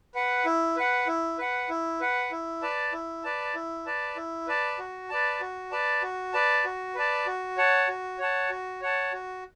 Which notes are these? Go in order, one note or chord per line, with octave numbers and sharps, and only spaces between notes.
B4 F#5
E4
B4 F#5
E4
B4 F#5
E4
B4 F#5
E4
B4 D5 A5
E4
B4 D5 A5
E4
B4 D5 A5
E4
B4 D5 A5
F#4
B4 D5 A5
F#4
B4 D5 A5
F#4
B4 D5 A5
F#4
B4 D5 A5
F#4
C#5 F#5 A5
F#4
C#5 F#5 A5
F#4
C#5 F#5 A5
F#4